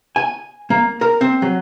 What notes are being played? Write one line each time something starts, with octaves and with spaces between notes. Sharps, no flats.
G#5
A#3
A#4
C4
F#3